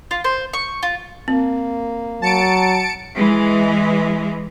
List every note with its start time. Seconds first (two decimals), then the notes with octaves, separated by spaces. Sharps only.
0.11 F4
0.24 C5
0.54 C#6
0.83 F4
1.28 A#3 C4
2.22 F#3 A5 C#7 D7
3.14 E3 G#3